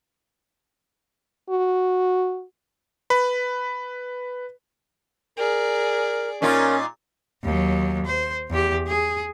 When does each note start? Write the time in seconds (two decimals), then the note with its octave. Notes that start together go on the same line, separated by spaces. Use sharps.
1.50 F#4
3.10 B4 B5
5.37 G#4 A#4 D5
6.42 A#2 C#4 D#4 F4 A#4
7.44 D#2 F#3
8.06 C5
8.50 E2 G4
8.88 G#4